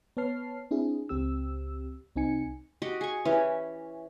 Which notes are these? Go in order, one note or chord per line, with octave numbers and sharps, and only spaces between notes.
B3 B4 C#5 A5 F6 C7
C4 D4 E4 G#4
C#2 C4 G4 E6
C2 C4 D#4 G#5 C#7
F#4 G4 D#5 F#5
G#4 C#6
E3 C#4 G4